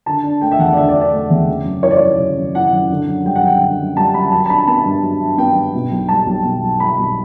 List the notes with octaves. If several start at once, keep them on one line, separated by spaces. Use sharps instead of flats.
D3 A5
D4
A3 G5
E5
E2 F#5
D5
D3 E5
D5
D4
D5
A3
E2
C#3
F#2
E3 C#5
D5
F#2 C#5
C#3
F#2
E3 F#5
F#2
D3
F#2
G3 G5
F#5
F#2 G5
D3
F#2
G3 A5
F#2 B5
F#3 A5
A5
D4 B5
B3 A5
G2
F#3
D4
B3 G5
G2
B2
B1
G3 A5
B1
B2
B1
G3 B5
B1